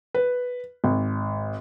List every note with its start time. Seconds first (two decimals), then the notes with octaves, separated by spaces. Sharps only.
0.14 B4
0.84 G#1